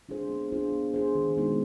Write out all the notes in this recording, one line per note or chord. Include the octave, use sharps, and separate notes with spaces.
D4 F4 G#4 C5
B3
D4 F4 G#4 C5
B3
D4 F4 G#4 C5
D#3
G#3 B3 D#4 F#4